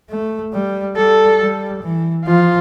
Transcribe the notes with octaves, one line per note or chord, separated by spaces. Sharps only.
A3
G3
G3 A4
G3
E3
F3 F4